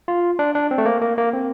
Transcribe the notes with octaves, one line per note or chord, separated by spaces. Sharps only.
F4
D4
D4
C4
A3
A#3
A#3
A#3
C4